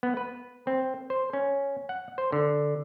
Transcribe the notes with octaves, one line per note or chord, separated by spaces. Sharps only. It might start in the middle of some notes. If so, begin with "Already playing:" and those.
B3
B4
C4
C5
C#4
F#5
C5
D3